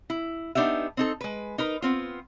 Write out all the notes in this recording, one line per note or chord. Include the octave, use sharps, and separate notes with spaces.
E4
B3 D4 D#4 G4 E5
C4 D#4 A4
G#3 B4
D#4 A#4 B4
B3 C4 F4